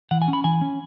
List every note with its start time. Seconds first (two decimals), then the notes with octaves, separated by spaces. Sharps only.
0.11 E3 F#5
0.22 G#5
0.28 C#4
0.33 B5
0.44 E3 G#5
0.61 C#4